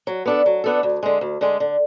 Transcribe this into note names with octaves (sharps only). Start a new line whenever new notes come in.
F#3
B3 D4 A4
F#3
B3 D4 A4
D2
D3 G#3
D2
D3 G#3
D3